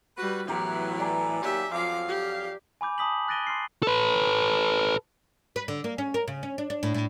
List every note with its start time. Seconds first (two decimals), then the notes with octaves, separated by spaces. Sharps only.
0.17 G3 F#4 B4
0.48 A2 E3 F#3 B3 G4 A#4
1.00 D5 G#5 A#5
1.42 D#2 F#3 G4 E5
1.72 F2 F3 F#3 F5 D6
2.08 G4
2.81 G#5 B5 D6 G6
2.98 A5 B5 D#6 B6 F#7
3.28 F#6 A6 A#6 D7 D#7 G7
3.47 C6 F6 C7
3.83 A4 B4
5.56 B4
5.68 D3
5.84 A#3
5.98 C#4
6.14 A#4
6.28 C#3
6.43 C#4
6.58 D4
6.70 D4
6.83 A2
6.94 A2